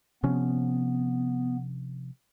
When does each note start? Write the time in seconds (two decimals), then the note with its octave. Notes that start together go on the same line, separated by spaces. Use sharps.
0.23 C3 F3 B3 C#4